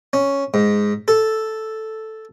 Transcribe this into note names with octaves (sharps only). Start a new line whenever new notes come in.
C#4
G#2
A4